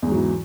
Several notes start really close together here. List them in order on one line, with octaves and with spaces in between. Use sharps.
E2 G#2 F#3 E3